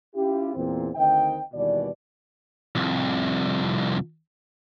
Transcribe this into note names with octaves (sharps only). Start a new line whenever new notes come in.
C#4 E4 F4 G4
E2 A#2 C4
D2 D#3 C4 D#5 G5
D#2 B2 E3 G3 D5
C2 F2